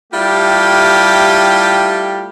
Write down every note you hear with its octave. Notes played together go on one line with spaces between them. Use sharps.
G3 A3 E4 F4 G4